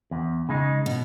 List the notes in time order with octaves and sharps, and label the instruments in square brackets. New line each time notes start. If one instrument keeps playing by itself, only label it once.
[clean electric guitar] E2
C#3 G#3 D#4
[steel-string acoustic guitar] B2